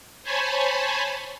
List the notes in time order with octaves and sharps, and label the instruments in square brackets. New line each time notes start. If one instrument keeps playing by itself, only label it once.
[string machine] C5 C#5 G#5 A5 B5